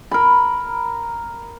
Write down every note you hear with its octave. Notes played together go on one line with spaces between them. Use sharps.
A#4 B5